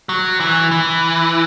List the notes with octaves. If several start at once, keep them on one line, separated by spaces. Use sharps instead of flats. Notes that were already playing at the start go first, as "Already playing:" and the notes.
F#3
E3
E3